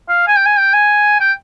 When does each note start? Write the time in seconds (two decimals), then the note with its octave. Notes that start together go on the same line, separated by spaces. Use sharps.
0.09 F5
0.27 G#5
0.36 G5
0.46 G#5
0.57 G5
0.73 G#5
1.20 G5